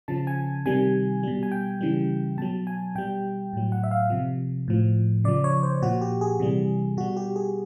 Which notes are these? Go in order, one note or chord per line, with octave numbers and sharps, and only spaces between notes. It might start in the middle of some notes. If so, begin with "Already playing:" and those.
C#3 F3 A5
G#5
C3 D#3 G3 G#5
B2 G3
G#5
G5
C#3 E3 G3
B2 F#3 A5
G#5
B2 G3 G5
A2 F#3
F#5
E5
F5
C3 F3
A2 F3
C#3 F3 D5
C#5
C5
A#2 F3 F#4
G4
G#4
C3 E3 G3
B2 G3 F#4
G4
G#4